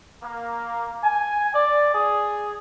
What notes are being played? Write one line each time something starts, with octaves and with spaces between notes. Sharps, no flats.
A#3
G#5
D5
G#4